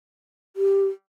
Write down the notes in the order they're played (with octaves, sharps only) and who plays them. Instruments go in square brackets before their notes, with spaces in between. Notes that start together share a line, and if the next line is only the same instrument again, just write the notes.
[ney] G4